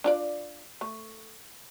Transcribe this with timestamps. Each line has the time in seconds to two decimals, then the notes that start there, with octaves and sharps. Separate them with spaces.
0.04 D4 F4 D5
0.81 A3